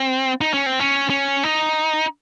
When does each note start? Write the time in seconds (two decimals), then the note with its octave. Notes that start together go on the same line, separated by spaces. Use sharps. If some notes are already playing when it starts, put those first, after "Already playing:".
Already playing: C4
0.41 D#4
0.54 C#4
0.66 C4
0.80 C#4
1.10 C#4
1.43 D#4